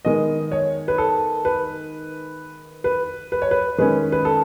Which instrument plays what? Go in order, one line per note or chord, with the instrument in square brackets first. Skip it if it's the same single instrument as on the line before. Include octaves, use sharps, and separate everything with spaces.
[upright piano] D#3 G#3 B3 D#5
C#5
B4
A4
B4
B4
B4
C#5
B4
D#3 G#3 C#4 B4
B4
A4